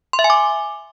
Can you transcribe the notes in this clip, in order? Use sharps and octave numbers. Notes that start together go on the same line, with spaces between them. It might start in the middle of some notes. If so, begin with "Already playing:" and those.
C6
E5
G#5
D6